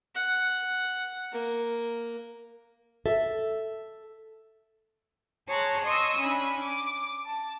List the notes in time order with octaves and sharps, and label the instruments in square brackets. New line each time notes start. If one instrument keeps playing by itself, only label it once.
[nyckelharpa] F#5
A#3
[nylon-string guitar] A4 E5
[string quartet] G#4 C#5 A5 A#5 C6 F#6
D#5 C6 C#6 D#6 E6
C#4 D4 G#5 B5
D6
A5